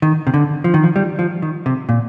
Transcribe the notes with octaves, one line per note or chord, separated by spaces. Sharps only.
D#3
C3
D3
F3
D#3
F3
G3
F3
D#3
C3
A#2